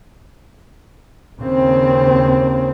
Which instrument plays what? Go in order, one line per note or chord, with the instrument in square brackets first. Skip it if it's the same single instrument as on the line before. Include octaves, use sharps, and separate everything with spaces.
[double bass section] D#2 C#3 C4